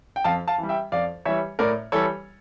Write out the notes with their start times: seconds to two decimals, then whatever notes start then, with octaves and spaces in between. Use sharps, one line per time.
0.16 G5
0.24 F2 F5 A5
0.48 F5 A5
0.58 E3 G3
0.69 E5 G5
0.92 F2 D5 F5
1.25 E3 G3 C#5 E5
1.59 A2 A#4 D5
1.92 E3 G3 A4 C#5